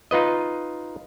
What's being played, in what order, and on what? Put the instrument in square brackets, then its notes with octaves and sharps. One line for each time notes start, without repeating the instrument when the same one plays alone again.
[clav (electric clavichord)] D#4 F4 B4 D#5